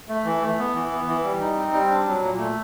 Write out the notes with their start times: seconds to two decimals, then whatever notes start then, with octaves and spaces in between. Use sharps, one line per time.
0.09 A3
0.25 E3
0.41 A3
0.58 B3
0.75 E3
0.91 B3
1.08 E3
1.24 G3
1.40 D#4
1.56 C4
1.73 G3
1.89 D4
2.06 F#3
2.22 A#2
2.38 A3